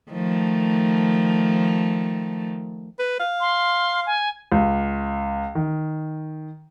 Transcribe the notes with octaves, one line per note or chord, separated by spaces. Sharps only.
D#3 F3 A3
B4
F5
C6
G#5
C#2
D#3